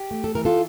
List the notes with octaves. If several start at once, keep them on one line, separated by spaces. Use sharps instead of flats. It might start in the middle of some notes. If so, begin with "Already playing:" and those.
Already playing: G4
A3
A4
E3 A#4
F4 A4